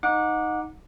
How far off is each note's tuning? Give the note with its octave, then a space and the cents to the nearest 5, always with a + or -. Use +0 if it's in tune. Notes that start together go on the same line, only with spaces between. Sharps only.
D#4 +0 F#5 -25 D6 +0